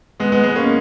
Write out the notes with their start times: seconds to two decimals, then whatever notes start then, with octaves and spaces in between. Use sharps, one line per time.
0.20 G#3 B3
0.32 G#3 B3
0.43 G#3 B3
0.55 A#3 C#4